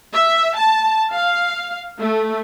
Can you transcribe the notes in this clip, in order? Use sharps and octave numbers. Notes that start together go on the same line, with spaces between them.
E5
A5
F5
A3